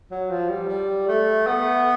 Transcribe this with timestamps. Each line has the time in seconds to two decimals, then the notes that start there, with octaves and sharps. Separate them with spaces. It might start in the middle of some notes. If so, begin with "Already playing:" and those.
0.11 F#3
0.30 F3
0.49 G3
0.68 G3
1.08 A3
1.47 B3